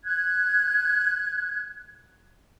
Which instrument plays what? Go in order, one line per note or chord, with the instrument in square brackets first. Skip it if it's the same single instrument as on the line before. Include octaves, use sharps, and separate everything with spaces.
[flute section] F#6 G#6